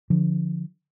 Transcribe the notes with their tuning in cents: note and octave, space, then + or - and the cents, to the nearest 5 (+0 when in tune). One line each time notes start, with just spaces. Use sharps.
D3 +5 F3 +0